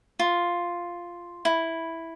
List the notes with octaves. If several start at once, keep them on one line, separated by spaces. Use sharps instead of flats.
F4
E4